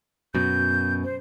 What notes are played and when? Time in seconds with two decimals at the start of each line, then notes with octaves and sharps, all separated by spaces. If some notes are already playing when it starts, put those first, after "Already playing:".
0.35 F#2 B2 G6
1.04 C5